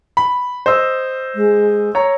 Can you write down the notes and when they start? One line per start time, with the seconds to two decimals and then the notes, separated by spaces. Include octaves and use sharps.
0.17 B5
0.66 C5 D#5 E6
1.34 G#3
1.95 C#5 A#5